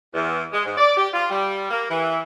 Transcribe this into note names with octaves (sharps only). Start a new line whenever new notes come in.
E2
G#3
G#2
D5
G4
F4
G3
A#3
E3